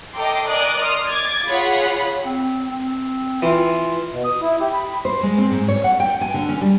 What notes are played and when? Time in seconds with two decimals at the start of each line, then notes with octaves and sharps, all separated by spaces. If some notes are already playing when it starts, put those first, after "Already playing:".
0.15 A4 D#5 G5 A#5 C6 D6
0.48 A#4 D5 D#5 G#5 D#6 F#6
0.79 C6 D#6 F6
1.09 D6 G#6 A6
1.47 F4 G#4 C#5 F#5 B5
2.25 C4
2.71 C4
3.42 E3 F4
4.12 B2
4.25 D#6
4.42 E4
4.61 G4
4.74 B5
5.05 C5
5.23 G#3
5.38 C4
5.51 G#2
5.68 C#5
5.84 F#5
6.00 G5
6.21 G#5
6.34 D3
6.49 C#4
6.61 G3